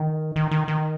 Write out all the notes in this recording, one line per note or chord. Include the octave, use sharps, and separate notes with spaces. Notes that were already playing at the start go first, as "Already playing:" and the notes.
Already playing: D#3
D#3
D#3
D#3